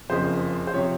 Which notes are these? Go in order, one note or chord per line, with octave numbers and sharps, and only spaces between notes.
F#1 F2 C#3 F3 C5
C5
C3 F3 C#5